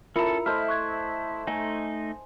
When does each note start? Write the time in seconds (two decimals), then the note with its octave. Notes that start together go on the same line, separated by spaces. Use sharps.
0.16 C#4 E4 F4 A4 A#4 A#5 C#7
0.46 A3 E4 C5 D#5 F6
0.68 C#6 F#6 G#6
1.47 A3 D#4 G#5